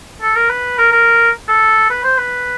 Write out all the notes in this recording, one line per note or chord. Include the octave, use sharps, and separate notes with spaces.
A4
A#4
B4
A#4
A#4
A4
B4
C5
B4